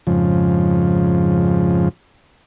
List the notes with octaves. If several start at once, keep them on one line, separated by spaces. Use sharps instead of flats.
F2 G#2 C#3 F3